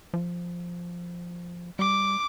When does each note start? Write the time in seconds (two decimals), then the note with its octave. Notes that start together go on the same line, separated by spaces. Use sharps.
0.14 F3
1.79 G3 D6